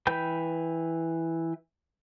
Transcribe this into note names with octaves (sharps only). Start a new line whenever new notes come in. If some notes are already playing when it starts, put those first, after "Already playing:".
E3 B4 G5 B5 G6